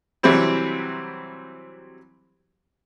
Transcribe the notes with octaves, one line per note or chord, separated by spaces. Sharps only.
C3 E3 F#3 G3 C4 E4